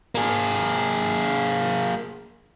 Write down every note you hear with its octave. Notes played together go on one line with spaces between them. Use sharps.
A#3 G#4